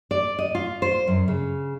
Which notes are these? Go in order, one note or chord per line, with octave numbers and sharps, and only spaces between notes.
D5
D#5
F4
C5
F#2
C#3